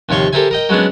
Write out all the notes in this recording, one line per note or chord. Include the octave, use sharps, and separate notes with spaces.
D#2 C3 F3 C#5 C6 C#6
G4 A4 A#4 C5 E5 G#5
A#4 D#5 G5
F#3 G#3 B3 C#4 D4